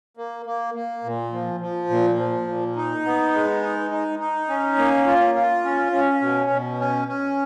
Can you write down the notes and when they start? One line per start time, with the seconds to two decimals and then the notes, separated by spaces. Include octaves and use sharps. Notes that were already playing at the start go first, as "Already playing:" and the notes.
0.17 A#3
0.46 A#3
0.75 A#3
1.04 A#2
1.33 F3
1.60 F3
1.90 A#2
2.18 F3
2.48 A#2
2.76 D#4
3.05 B3
3.34 G#3
3.62 D#4
3.91 D#4
4.19 D#4
4.49 C#4
4.78 A#3
5.06 F4
5.35 F4
5.64 C#4
5.92 C#4
6.21 B2
6.51 B2
6.79 C#4
7.08 C#4